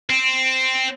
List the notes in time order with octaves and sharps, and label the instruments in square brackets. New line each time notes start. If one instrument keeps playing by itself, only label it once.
[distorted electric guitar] C4